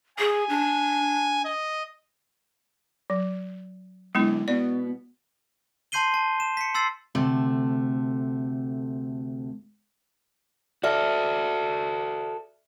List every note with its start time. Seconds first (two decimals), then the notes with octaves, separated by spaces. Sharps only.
0.19 G#4 G#5
0.49 D4
1.45 D#5
3.10 F#3
4.15 F#2 D3 G#3 B3 E4
4.48 B2 B3 D5
5.92 A5 C6 G6 C7 D#7 G7
6.14 A5
6.40 E7
6.57 B6 C#7
6.74 C6 E6 A6 C7
7.15 D2 C3 A3
10.83 F#4 A4 D5 E5 F6